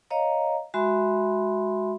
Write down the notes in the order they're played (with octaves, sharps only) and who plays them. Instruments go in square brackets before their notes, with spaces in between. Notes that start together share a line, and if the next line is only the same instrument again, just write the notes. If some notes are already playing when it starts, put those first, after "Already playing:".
[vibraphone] C#5 D#5 F5 A#5
G#3 F#4 E5 B5 C6